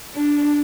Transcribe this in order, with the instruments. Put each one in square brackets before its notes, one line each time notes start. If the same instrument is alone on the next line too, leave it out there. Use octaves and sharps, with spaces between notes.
[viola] D4